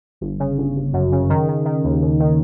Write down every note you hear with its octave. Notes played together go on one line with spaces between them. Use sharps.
G1
C#3
G1
G1
F#2
C#3
D#3
D#3
D#3
D#2
D#2
D#3